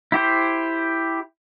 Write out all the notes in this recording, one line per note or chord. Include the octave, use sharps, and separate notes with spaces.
E4 G4 C5